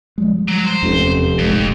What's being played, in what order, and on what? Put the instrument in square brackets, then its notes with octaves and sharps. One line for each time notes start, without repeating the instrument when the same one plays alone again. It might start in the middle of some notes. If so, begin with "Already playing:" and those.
[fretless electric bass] F3 G3 G#3
[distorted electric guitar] F#3
C5
[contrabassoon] F1 [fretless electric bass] E2 C#4
[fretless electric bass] D#1 A#1 G#3 [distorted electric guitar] F2